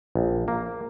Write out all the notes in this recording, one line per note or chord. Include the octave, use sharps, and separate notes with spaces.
A#1
A#3